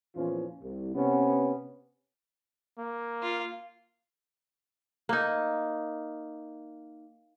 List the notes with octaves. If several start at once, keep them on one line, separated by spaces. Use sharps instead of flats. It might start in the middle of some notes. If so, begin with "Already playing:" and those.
E2 A#2 E3 F3 C#4 F4
C2
C3 B3 C#4
A#3
F4
A#3 D#4